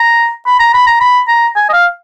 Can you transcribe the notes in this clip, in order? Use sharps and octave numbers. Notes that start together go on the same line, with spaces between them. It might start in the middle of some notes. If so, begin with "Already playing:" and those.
Already playing: A#5
B5
A#5
B5
A#5
B5
A#5
G#5
D#5
F5